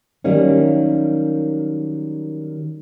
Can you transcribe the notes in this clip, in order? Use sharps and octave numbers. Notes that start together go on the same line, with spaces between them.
D#3 F#3 G3 A#3 C#4 D#4